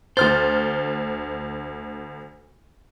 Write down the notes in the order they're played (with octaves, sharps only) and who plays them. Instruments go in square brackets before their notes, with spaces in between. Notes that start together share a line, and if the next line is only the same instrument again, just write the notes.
[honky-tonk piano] D2 F6 A6 [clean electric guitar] C5